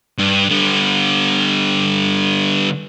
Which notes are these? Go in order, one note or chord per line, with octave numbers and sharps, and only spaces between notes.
G2
D3 G3